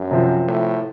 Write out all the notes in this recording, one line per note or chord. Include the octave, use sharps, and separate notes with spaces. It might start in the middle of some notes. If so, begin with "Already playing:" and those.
Already playing: F#2
C3 F3 C4
A2